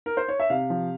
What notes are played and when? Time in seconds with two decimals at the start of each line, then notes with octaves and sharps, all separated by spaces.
0.06 A#4
0.17 C5
0.28 C#5
0.40 E5
0.50 C3 F5
0.70 F3